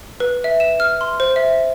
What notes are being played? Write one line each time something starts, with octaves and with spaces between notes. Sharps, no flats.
B4
E5
E7
F6
C6
C5
E5